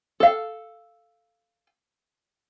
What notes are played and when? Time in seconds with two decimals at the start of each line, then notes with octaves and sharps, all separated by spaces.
0.20 A4 F5